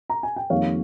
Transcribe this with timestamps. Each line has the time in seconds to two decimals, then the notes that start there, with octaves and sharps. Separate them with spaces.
0.10 A#5
0.23 G#5
0.36 G5
0.50 F2 D#3 G3 A#3 C#5 F5